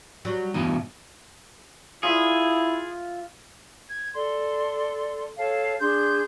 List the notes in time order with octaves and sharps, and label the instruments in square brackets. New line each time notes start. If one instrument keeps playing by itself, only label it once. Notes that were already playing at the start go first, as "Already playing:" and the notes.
[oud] F#3 G3
[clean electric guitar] E2 G2 B2 [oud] D#4
[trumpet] E4 [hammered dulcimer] F4 E5 [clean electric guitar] G#4
[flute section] G#6
A4 D5 C6
A4 C#5 F5 A5
D4 G#4 C6 G6